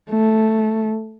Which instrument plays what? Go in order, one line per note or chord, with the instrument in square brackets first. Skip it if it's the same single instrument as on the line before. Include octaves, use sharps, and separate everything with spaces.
[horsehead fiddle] A3